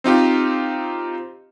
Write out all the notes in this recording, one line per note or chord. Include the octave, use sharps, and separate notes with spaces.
C4 D#4 F4 G4